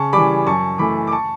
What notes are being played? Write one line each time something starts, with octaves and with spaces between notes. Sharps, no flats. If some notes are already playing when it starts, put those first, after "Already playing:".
Already playing: C#3 A5 C#6
E3 G3 B5 D6
F#2 A5 C#6
E3 A3 B5 D6
D6
A5 C#6